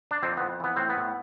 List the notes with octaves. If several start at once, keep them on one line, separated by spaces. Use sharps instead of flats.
D4
F2 C4
F2 B3
E3 B3
A2 C4
B3
A2